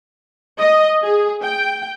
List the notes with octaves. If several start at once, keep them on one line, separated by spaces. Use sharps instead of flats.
D#5
G#4
G5